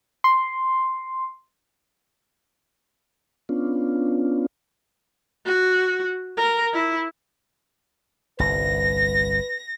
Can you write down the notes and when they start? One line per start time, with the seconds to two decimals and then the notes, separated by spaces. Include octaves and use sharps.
0.24 C6
3.49 B3 C#4 D4 F4
5.46 F#4
6.37 A#4
6.74 E4
8.39 G1 C2 B4 A#6